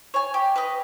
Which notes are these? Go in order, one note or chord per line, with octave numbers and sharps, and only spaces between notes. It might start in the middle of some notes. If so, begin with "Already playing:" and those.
C#5 G#5
G4
B4 D#5